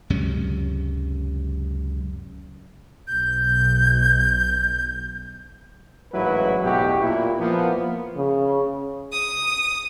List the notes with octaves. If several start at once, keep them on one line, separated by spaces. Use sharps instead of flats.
C#2 F#2 C3 C#4
B1 B2 G6
A1 G#2 F#3 A#3 E4 B4
A1 E2 B2 F#4 G4
A#2 E4
F3 A#3 B3
C#3
D#6